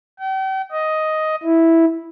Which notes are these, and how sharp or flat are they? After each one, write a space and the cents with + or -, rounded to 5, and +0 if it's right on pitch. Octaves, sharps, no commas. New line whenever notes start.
G5 -40
D#5 +5
E4 -5